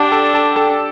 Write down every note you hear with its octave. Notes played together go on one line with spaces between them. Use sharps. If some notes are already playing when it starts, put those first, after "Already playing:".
Already playing: D4 G4 D5 F#5 G5 D6
A4 A5
A4 A5
A4 A5